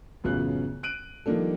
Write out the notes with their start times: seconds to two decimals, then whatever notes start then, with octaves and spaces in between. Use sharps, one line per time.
0.24 A1 F#2 C#3 B3 F4 F#6
0.83 F#6 D7 D#7 F#7
1.26 D#3 F3 G3 A#3 D4 A4